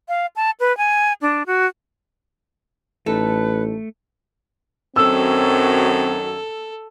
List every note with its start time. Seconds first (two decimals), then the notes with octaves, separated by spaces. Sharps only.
0.08 F5
0.36 A5
0.60 B4
0.78 G#5
1.21 D4
1.47 F#4
3.06 A1 A3 D#4 A4 B4
4.96 F#2 D#3 F#3 C4 A4 E6